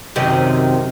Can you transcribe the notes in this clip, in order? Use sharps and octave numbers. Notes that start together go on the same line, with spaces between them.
F#2 C3 D#3